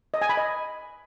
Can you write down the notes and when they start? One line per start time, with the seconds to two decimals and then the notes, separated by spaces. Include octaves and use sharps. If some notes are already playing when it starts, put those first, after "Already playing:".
0.14 D#5
0.22 G#5
0.29 B5
0.37 D#5